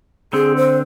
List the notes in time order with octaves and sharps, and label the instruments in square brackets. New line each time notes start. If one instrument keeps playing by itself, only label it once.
[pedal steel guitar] D3 C4 [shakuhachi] G#4
[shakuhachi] C5